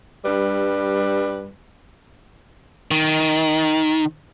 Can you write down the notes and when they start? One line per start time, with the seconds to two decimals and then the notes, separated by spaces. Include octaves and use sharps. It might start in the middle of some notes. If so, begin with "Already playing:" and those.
0.24 G2 G3 B4
2.91 D#3